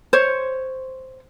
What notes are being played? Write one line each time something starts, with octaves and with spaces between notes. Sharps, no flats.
C5 C#5